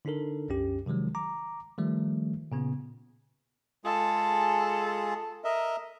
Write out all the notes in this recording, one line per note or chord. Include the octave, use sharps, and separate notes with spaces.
D3 D4 D#4 A4 A#4
C2 F#2 C#4 G4
C3 D#3 F3 F#3 G#3
A#5 D6
D#3 F3 G3 A3
A#2 C#3 B3
G#3 F4 G#4 A4
A#4 D#5 E5